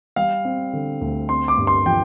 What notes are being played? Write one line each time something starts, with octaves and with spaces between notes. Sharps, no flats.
G3 F5
C4
D3
D2
C4 C6
D6
G2
C6
F3 G5